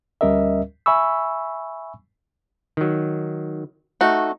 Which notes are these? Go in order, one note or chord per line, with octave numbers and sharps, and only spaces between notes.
D2 G3 C#4 A#4 D#5 E5
E5 G#5 B5 C#6 E6
D#3 F#3
A3 D#4 F#4